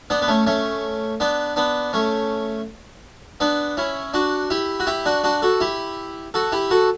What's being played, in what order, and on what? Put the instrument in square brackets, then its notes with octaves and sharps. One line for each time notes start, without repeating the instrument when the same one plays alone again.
[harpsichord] B3 D4
B3
A3 C#4
A3 C#4
B3 D4
B3 D4
A3 C#4
B3 D4
C#4 E4
D4 F#4
E4 G4
F#4
E4 G4
D4 F#4
D4 F#4
F#4 A4
E4 G4
F#4 A4
E4 G4
F#4 A4